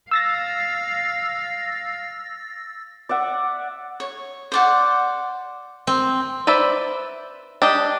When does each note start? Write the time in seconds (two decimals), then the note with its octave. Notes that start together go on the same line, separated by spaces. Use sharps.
0.11 F5 E6 A6 A#6
3.09 D5 E5 F#5
4.00 C#5
4.52 C5 D5 F#5
5.87 C4
6.47 B4 C5 D5 E5
7.62 D4 G4 D#5